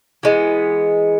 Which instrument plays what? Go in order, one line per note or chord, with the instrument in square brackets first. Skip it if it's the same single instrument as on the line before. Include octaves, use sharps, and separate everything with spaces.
[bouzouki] E3 G#3 B3